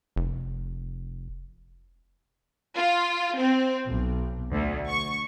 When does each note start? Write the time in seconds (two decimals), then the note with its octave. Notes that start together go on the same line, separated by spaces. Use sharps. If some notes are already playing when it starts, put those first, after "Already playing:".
0.16 F1
2.76 F4
3.37 C4
3.89 B1
4.52 D2
4.88 C#6